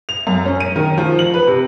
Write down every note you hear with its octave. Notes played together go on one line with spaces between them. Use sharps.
F7
F#2
C#4
D#7
D#3
F3
F#7
B4
C3